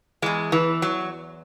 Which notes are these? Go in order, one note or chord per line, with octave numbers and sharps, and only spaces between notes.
E2 E3 G#3
E3
F#3